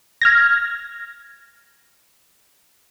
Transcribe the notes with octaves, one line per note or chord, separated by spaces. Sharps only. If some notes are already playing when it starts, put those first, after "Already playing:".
F6 G#6 A#6